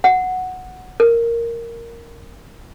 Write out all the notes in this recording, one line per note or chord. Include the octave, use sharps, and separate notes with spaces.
F#5
A#4